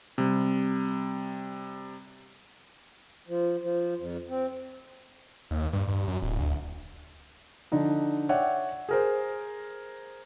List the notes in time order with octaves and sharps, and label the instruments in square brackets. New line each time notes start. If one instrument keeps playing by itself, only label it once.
[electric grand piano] C3 G3
[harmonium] F3
F3
F2
C4
[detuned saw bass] D#2
G2
G2
F#2
D1
D2
[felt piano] D3 F3 D#4
C#5 D5 E5 F#5 G5
G#4 A#4 C5